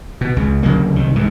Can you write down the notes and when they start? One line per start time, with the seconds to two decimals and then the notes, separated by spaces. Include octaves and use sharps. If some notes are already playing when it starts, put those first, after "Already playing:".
0.21 B2
0.36 C#2 C#3
0.63 D2 C#3 F#3 A#3
0.96 C2 D#3
1.16 G#2 E3